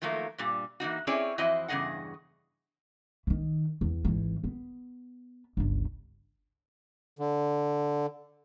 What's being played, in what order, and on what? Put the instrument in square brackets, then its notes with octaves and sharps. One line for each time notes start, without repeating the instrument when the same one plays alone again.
[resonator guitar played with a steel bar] D#3 F3 F#3 A3 A#3
G2 A#2 G3
E3 A#3 D#4 F#4
C4 C#4 E4 G#4 C#5 D5
F2 E3 E4 F#4 C5 D#5
E2 G2 C#3 G#4 D#5 F#5
[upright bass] D#3 E3
E2
G#1 E3
B3
G1 C#2
[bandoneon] D3